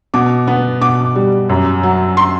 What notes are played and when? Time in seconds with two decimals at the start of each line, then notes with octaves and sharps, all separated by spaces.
0.14 B2 D6
0.47 B3
0.81 B2 D6
1.15 G3
1.49 F#2
1.83 F#3
2.17 C6